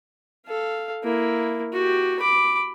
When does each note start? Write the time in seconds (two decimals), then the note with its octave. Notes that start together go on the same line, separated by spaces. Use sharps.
0.46 A4 F5
1.04 A#3 E4
1.73 F#4 G4
2.20 B5 D6